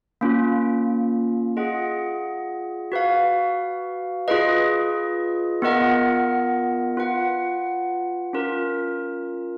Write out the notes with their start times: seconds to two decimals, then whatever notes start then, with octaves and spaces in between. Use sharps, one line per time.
0.21 A#3 C#4 F4
1.57 F4 G#4 D#5 F#5
2.92 F#4 B4 F5
4.28 F4 G#4 B4 D#5
5.62 B3 F4 A#4 D#5 F#5
6.97 F4 B4 F#5
8.33 C#4 F4 A#4